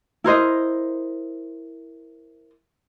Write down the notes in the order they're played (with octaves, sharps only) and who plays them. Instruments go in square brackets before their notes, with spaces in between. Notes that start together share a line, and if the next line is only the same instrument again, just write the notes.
[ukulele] E4 A#4 C5 D#5